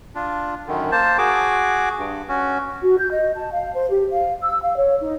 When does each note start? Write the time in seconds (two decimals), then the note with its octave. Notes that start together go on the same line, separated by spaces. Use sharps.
0.15 D4 F4
0.67 F#2 D3 D#3
0.92 A#3 C5 A5
1.18 F#4 G#4 D6
1.98 G2
2.29 C#4 F#4
2.82 F#4
2.99 G6
3.11 D#5
3.35 A5
3.52 F5
3.73 C5
3.89 G4
4.10 F5
4.42 E6
4.62 F5
4.77 C#5
5.01 D#4